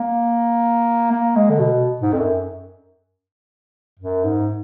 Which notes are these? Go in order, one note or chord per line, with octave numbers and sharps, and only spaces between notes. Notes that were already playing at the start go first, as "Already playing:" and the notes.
Already playing: A#3
A#3
G#3
D3
B2
G#2
F2
F#2
F#2
G#2